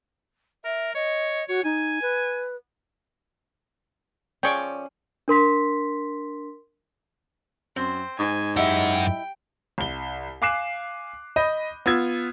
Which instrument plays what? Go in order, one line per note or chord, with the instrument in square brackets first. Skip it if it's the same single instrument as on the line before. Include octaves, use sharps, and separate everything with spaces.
[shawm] A#4 [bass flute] E5
[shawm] C#5 [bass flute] D#5
[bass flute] F#4 [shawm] C#5
[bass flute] D#4 [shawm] G#5
[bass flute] B4
[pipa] F3 G#4 D5 [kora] C#4 [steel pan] G5 C#6
[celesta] D4 A#4 C6 B6
[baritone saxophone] F#2 [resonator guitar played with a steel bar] C4 [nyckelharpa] C5
[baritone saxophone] G#2 [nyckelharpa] G#5
[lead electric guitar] F#2 F#5 [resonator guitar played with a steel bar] E4 D#5 E5 [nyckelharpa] G4
[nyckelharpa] G5
[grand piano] C2 G7
F5 G#5 D6 F#6 C7 E7
D#5 B5 G6 D#7
B3 F4 E6 G#6